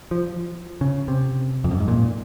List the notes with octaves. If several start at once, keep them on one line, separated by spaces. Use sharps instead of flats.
F3
C#3
C3
F2
F#2
G#2
A#2